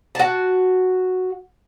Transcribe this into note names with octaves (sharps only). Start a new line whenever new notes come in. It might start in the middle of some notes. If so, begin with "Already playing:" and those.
F#4 A5